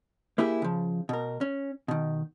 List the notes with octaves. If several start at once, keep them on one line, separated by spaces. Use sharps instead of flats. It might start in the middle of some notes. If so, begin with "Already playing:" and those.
A#3 E4 G4 G#4
C#3 F3
B2 A#4
C#4
B2 D#3